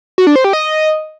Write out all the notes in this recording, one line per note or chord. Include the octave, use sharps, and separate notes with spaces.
F#4
D4
C5
G4
D#5